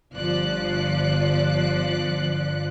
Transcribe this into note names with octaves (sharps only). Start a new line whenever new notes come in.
G1 F3 D5 F#6